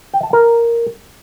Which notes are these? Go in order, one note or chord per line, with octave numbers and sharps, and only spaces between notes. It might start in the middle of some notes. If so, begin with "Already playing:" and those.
G5
A5
A#4